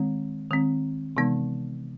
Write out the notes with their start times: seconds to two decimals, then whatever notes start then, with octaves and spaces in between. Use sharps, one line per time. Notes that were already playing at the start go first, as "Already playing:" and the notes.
Already playing: D#3 G#3 C4
0.51 D#3 G#3 C4
1.17 C3 E3 G#3 B3 D#4